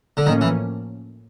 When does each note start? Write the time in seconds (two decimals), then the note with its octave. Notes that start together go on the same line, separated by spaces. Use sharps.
0.17 D3
0.26 A2 D#3 F3 A#3 C#4
0.41 E3